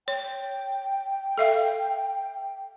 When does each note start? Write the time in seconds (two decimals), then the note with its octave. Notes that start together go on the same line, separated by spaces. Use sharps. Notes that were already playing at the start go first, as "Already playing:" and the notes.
0.08 C#5 G5
1.38 A4 E5 F5